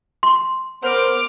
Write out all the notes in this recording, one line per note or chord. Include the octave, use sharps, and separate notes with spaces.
C6
B3 A#4 C5 D6 F6